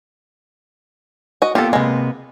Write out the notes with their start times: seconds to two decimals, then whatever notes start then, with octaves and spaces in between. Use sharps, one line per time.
1.42 F#4 D#5
1.55 A#3 B3 F4 G4 A4
1.73 C3 G#3 A#3 B3